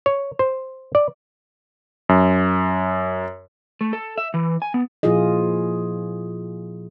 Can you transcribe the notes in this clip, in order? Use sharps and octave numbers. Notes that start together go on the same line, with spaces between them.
C#5
C5
D5
F#2
A3
A4
E5
E3
G#5
B3
A#2 F3 E4 F4 G#4 D#5